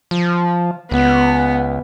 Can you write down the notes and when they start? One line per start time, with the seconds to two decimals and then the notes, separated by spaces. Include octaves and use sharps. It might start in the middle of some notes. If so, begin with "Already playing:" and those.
0.11 F3
0.91 C#2 B3